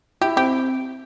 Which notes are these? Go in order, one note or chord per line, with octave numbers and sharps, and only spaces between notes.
E4 G4
C4 G4